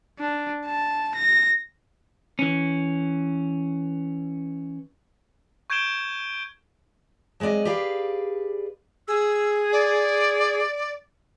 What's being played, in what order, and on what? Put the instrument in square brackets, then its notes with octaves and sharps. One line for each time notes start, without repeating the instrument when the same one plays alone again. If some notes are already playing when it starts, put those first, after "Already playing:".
[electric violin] D4
A5
A#6
[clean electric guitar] E3 C#4
[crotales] C#6 G6 G#6 D7 E7 G7
[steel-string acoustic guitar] F#3 G#3 C4 D5 D#5
G4 G#4 B4 D5 F5
[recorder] G#4 [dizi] E6
[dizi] D5